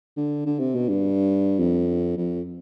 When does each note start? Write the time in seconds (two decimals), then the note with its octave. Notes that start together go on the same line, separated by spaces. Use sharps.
0.17 D3
0.46 D3
0.60 C3
0.75 B2
0.89 G2
1.60 F2
2.17 F2